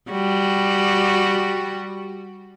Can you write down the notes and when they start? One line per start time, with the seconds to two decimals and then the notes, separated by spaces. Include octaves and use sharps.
0.11 G3 F#4